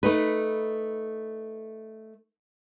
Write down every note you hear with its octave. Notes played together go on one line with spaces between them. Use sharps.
A3 D#4 B4